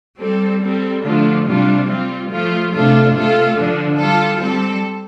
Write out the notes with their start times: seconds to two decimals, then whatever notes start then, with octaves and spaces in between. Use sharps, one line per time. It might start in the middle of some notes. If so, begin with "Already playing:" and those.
0.19 G3 C4 A4
0.62 G3 C4 A4
1.03 D3 F3 A3 D4 F4
1.46 C3 G3 D4 F4
1.88 G3 C4 F4
2.30 F3 A3 F4
2.73 C3 A3 D4 F4 A4
3.14 C3 A3 F4 A4
3.57 D3 F3 D4
3.98 G3 F4 A4
4.40 G3 C4 A4